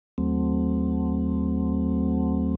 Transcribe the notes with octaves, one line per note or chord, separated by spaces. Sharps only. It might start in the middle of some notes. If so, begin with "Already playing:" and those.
D#2 F#3 A3 C4